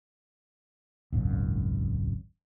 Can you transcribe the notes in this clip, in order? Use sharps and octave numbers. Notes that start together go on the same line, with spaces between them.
D#1 G#1 C#2 F#2